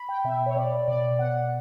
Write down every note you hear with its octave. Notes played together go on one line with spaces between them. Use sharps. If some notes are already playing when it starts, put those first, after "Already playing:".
Already playing: B5
G5
B2 E5
C#5
B2 D5
B2 D5
B2 F#5